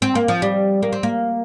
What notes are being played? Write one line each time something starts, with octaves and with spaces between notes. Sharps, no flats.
C4
A#3
F3
G3
A#3
C4
A#3